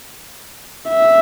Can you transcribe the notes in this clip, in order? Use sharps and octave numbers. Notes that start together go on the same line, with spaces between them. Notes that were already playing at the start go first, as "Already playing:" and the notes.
E5